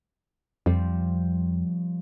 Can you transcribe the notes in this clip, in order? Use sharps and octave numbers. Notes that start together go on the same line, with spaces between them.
F2 F3 G3 C4